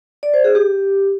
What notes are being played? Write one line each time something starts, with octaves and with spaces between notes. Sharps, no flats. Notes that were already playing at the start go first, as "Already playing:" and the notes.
D5
C5
G#4
G4